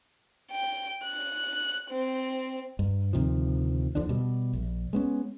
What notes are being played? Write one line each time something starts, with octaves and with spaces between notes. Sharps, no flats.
G5
F#6
C4
G2
D2 C3 D#3 F3
D#2 D3 F3 D4
B2 G3
A#1
G#3 B3 C#4